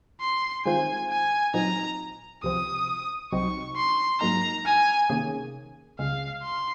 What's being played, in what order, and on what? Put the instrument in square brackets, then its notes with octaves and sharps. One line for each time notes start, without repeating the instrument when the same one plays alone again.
[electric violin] C6
[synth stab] D#3 G#3 C4 F4 C5 [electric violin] G#5
[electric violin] G#5
[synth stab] A#2 F#3 C4 D#4 [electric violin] A#5
[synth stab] C#2 C3 F3 C4 [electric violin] D#6
[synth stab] C2 C3 F#3 C4 D#4 [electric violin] C#6
[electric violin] C6
[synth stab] G#2 F#3 A#3 D#4 [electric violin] A#5
[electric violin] G#5
[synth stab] C3 D#3 A#3 C#4 G#4
[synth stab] C#2 C#3 G#3 [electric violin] F5
[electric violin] C6